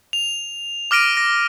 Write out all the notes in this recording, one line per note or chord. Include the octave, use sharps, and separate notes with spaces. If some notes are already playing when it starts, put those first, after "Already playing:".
F7
D6 F6 A#6 D7 D#7
A#6